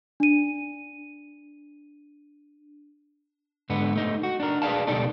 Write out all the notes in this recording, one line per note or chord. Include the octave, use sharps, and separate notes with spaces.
D4 D#7
G#2 D3 B3
A3 D#4
F#4
D4 A#4
G#4 B4 C#5 D5 F5 A5
C#2 B2 G3 D#4 A4 D5